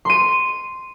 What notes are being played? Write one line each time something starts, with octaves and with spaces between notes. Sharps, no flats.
C6 D#7